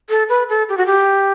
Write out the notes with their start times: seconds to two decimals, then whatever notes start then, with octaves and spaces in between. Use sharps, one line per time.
0.10 A4
0.29 B4
0.49 A4
0.69 G4
0.77 F#4
0.86 G4